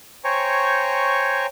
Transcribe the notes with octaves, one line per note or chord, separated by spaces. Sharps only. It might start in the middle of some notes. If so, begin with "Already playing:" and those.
C5 C#5 G5 G#5 A#5 C#6